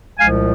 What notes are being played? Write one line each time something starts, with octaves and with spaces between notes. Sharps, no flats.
C2 A#2 F3 G#3 F5 G#5